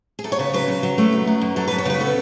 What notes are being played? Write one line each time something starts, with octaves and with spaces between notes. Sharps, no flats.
G#4
F#2 A4
C#5
C#3 B4
F#3 B4
C#3
F#3
A3
F#2
F#3
F#2
F#3 A4
F#2 B4
C#5
C#3 B4
B3 A4